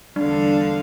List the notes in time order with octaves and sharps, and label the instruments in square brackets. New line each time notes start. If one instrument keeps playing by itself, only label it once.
[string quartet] E2 D3 F5 [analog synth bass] G3 [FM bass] D4